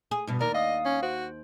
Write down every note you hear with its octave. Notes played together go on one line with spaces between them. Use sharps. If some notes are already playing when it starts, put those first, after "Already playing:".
G#4
G2 B2
D#2 A#4 D5
D#5 F5 D#6
C#4
F#4 C5